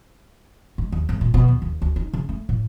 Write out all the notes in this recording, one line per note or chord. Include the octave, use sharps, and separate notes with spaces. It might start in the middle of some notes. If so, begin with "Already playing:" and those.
G#2
D#2
G#1
A#2
B2
D#2
D#2
D2
D#4
C#3
A3
A2